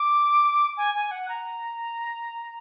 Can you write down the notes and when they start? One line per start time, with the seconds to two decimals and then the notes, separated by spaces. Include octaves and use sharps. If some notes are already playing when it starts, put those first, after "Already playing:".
Already playing: D6
0.77 G#5
0.95 G#5
1.11 F#5
1.29 A#5